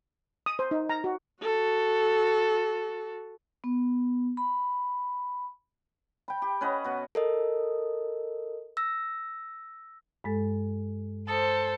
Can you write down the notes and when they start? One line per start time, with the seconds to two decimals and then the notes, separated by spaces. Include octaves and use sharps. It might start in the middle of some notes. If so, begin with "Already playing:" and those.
0.46 D#6
0.59 C5
0.71 D#4
0.89 A#5
1.04 F#4
1.43 F#4 A4
3.64 B3
4.37 B5
6.28 G5 B5
6.42 G4
6.61 C#4 B4 D#5 F#5
6.84 B2 F#4
7.15 A4 A#4 D#5
8.77 E6 A#6
10.24 G2 G#3 A4
11.28 A4 C5 D#6